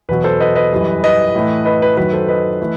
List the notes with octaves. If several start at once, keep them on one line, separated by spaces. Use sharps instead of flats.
E2 B2 F#3 B4
A4 C5
B4 D#5
B4 D#5
F#2 E3 G3
B4 D#5
A2 E3 A3
B4 D#5
B4
F#2 D#3 F#3 B4
A4 C5
B4 D#5
E3 A3